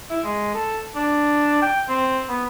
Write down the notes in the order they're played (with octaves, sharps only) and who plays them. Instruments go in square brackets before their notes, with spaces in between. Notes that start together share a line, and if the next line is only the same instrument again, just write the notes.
[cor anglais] E4
G#3
A4
D4
G5
C4
B3